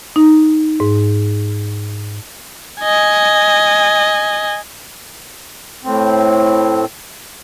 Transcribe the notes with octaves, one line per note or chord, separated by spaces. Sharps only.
D#4
G#2
D#5 G#5
A2 C4